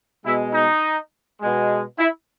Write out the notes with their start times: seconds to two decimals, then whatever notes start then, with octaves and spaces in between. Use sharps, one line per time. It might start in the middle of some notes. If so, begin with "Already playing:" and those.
0.25 B2 G#3 E4
0.54 D#4
1.41 B2 G#3
1.99 E4